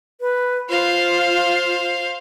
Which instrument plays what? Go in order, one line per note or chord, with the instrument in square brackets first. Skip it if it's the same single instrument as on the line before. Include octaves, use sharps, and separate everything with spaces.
[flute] B4
[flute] F4 [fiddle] C5 F5